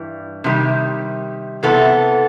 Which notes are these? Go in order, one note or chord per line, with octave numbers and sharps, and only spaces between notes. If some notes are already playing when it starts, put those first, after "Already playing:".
Already playing: G2 E3 G3
C3 D#3 G3
C3 E3 B3 A4